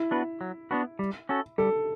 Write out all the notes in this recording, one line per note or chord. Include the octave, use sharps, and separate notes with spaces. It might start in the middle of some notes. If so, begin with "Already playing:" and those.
Already playing: E4
B3 D4 F#4 B4
F#3
B3 D4 F#4 B4
G3
C#4 F#4 A4
G3 A4